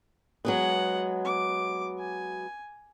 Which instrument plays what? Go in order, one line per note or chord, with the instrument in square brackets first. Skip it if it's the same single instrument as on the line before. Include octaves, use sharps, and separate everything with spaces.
[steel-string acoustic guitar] F#3 G#3 B3 [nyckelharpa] G#4 F#5
[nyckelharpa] D6
G#5